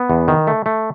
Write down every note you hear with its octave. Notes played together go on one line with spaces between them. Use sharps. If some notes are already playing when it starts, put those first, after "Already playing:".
Already playing: B3
E2
D#3
A3
A3